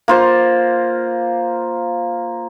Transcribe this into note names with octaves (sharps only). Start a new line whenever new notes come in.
A#3 F4 C5